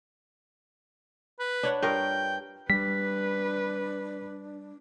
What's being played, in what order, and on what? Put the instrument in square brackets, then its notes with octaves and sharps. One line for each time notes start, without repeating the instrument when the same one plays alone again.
[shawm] B4
[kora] D4 C#5 F#5
[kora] G2 F4 A#4 [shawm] G5
[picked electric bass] G3 [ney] D4 [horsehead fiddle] B4 [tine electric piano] B6